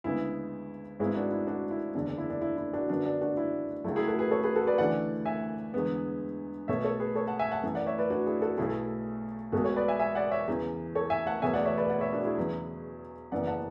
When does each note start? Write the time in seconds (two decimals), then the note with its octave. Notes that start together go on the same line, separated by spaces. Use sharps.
0.04 D2 C#3 G#3 B3 E4
0.99 G#1 G#2 G#3 B3 E4
1.15 D4 F#4
1.32 E4
1.47 D4 F#4
1.71 E4
1.95 F#1 E2 D3 D4
2.07 D4
2.18 E4
2.30 D4
2.41 E4
2.57 E4
2.73 D4 F#4
2.89 F#2 D3 F#3 B3 D4 F#4
3.06 D4
3.21 D4 F#4
3.37 E4
3.84 C#2 C#3 F#3 A3 E4
3.96 E4 G#4
4.07 F#4 A4
4.19 G#4 B4
4.31 A4 C#5
4.43 G#4 B4
4.56 F#4 A4
4.67 B4 D5
4.78 D2 C#3 E3 A3 D5 F#5
5.26 E5 G#5
5.74 E2 D3 G#3 B3
6.68 B1 B2 A3 C#5 E5
6.84 A4 C#5
7.00 G#4 B4
7.15 A4 C#5
7.27 F#5 A5
7.39 E5 G#5
7.51 F#5 A5
7.63 F#2 E3 A3
7.75 D5 F#5
7.86 C#5 E5
7.98 B4 D5
8.10 D4 F#4
8.26 E4 G#4
8.41 F#4 A4
8.57 B1 B2 A3 E4 G#4
9.52 B1 B2 G#3 B3 F#4 A4
9.64 A4 C#5
9.76 B4 D5
9.88 E5 G#5
9.99 E5 G#5
10.15 D5 F#5
10.31 C#5 E5
10.47 E2 C#3 E3
10.95 A4 C#5
11.10 E5 G#5
11.27 F#5 A5
11.42 E1 E2 B2 A3 E5 G#5
11.54 D5 F#5
11.65 C#5 E5
11.77 B4 D5
11.90 D5 F#5
12.01 C#5 E5
12.13 D4 F#4
12.25 E4 G#4
12.38 E2 C#3 F#3 B3
13.32 F#1 F#2 E3 B3 D5 F#5
13.47 F#5 A5